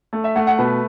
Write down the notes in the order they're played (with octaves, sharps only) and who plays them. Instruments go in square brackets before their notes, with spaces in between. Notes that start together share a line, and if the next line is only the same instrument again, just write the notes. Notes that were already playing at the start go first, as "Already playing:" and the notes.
[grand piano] A3
E5
A3 F#5
F#5
B2 B4